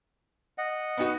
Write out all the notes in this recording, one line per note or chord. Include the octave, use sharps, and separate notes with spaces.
D#5 F#5
B3 D#4 F#4